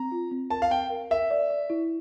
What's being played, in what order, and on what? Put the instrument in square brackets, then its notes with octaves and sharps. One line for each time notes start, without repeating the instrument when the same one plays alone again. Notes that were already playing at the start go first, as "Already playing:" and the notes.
Already playing: [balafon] C4 [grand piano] A#5
[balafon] F4
C4
[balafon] A#4 [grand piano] A5
[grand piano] F5
[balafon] C4 [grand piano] G5
[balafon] A#4
[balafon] A#4 [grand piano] E5
[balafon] D5
D5
E4